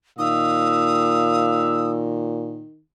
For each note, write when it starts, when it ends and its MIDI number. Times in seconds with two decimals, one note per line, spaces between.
0.19 2.65 46
0.19 2.80 51
0.19 1.98 77
0.19 1.92 87
0.19 1.98 88